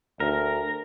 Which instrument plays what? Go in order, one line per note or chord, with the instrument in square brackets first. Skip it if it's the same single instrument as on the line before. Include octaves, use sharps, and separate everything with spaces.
[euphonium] D2 [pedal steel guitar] A#4